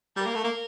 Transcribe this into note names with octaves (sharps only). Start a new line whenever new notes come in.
G3 A#4
A#3
A3
A#3